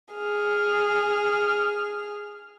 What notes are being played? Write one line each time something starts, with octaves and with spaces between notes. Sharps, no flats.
G#4 F6